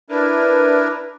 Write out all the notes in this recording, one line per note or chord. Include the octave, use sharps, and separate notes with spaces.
D4 E4 A#4 B4